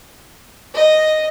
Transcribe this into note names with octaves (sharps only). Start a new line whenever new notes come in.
D#5